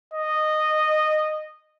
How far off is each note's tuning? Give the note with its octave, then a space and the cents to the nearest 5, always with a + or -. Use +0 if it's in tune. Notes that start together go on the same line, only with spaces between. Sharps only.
D#5 -15